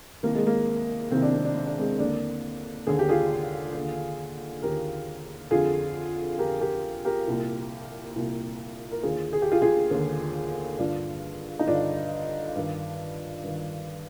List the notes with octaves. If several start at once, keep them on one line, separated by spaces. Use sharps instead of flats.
C2 C3 D#3 A#3
G#3
A#3
C2 C3 D#3 C4
D4
C4
D4
C4
D4
G#3 C4
D#2 D3 A#3 D4
D#2 D3 G#4
G4
F4 G#4
D#2 D3
D#2 D3 G4 A#4
F2 D3 F4 G#4
F2 D3 G4 A#4
G4 A#4
G4 A#4
C2 A#2
C2 A#2
A#4
D#2 D3 F4 G#4
G#4
G4
F4 G#4
F4 G#4
D#2 D3
G2 D3 D4 F4
D#4
G2 D3 D4 F4
G2 D#3
G2 D#3